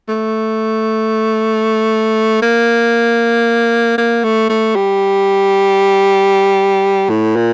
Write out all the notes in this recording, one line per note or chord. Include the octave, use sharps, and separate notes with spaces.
A3
A#3
A#3
A3
A3
G3
A2
A#2